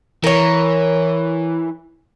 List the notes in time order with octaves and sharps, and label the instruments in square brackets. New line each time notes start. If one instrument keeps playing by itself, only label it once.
[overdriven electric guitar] E3 [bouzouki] A#4 C#5